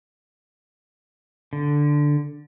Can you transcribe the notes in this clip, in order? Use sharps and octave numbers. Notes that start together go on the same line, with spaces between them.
D3